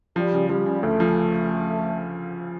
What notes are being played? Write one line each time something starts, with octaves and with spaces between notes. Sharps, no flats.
F3 G3
C#3
F3 G3
C#3
D2 A3
F3